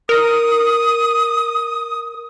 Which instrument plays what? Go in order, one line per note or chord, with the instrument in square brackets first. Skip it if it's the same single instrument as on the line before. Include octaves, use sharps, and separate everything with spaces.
[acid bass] A#4 [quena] D#6